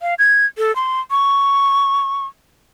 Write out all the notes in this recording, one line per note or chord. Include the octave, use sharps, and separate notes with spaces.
F5
G#6
A4
C6
C#6